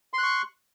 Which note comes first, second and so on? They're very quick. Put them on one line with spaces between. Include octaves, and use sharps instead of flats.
C6 F#6 C#6